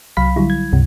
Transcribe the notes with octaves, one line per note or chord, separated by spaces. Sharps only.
C2 F#3 F5 B5 B6
D3 F#3 G3 E4
G#6
C#2 G2 C3